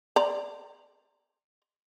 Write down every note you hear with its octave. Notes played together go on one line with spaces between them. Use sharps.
D5 A#5